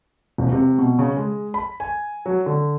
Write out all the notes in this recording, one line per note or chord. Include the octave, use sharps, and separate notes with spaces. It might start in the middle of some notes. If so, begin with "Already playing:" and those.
E1
C3
B2
C#3
G#3
B5
G#5
F#3
D3